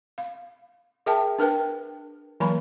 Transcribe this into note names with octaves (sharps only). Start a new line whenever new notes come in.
F5
G#4 A#4 E5 G5 A5
D4 A#4 B4 G5
E3 F#3 A#3 G#5 A#5 B5